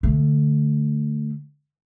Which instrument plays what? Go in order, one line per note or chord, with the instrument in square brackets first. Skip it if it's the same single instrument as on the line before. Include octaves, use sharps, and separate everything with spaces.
[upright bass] D3 A3